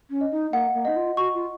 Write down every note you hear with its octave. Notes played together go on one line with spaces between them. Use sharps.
C#4
D#5
D#4
A#3 F#5
A#3
D#4 D#5
F4
F#4 C#6
F4